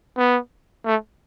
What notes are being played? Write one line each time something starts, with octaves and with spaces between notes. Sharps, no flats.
B3
A3